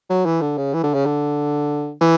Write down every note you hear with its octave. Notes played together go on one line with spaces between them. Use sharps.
F#3
E3
D3
C#3
E3
D3
C#3
D3
E3